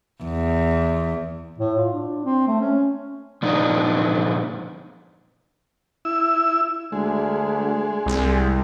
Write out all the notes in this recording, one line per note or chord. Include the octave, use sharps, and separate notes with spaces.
E2
A2
F4
D4
C4
A3
C#4
F2 A#2 D4 D#4
E4 E6
D2 G#3
C2